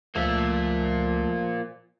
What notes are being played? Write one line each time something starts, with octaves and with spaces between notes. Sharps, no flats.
C#2 F3 A3 A#3 F4 E5